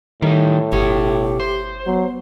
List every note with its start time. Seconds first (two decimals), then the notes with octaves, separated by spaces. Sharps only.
0.22 A2 D#3 G3 D#4
0.72 G1 B2 G4 C#5
1.40 C5
1.86 F#3 B3